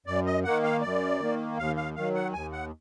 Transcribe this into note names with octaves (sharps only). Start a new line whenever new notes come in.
F#2 D5
D#5
D#3 A#3 F#5
F5
F#2 D5
D#3 A#3
D#2 F5
F5
D#3 F#3 F5
F#5
D#2 G#5
F#5